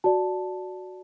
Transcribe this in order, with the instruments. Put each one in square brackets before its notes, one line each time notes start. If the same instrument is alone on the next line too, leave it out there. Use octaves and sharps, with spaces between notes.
[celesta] F#4 D5 A5